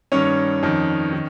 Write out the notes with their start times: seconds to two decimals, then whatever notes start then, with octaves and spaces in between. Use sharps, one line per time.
0.12 G2 D#3 C#4 C#5
0.63 F2 D#3
1.13 D#3